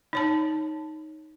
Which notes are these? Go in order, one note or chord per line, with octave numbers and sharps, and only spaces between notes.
D#4 C#5 A5